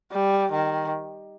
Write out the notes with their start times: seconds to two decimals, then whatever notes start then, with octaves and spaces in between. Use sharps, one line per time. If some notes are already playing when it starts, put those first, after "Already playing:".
0.12 G3
0.52 D#3